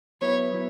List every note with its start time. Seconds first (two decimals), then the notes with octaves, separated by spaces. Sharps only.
0.21 F#3 B3 E4 B4 C#5
0.53 F#3 B3 E4 B4